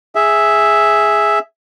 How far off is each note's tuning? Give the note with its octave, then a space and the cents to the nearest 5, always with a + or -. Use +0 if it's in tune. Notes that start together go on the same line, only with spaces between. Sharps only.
G#4 +0 E5 +0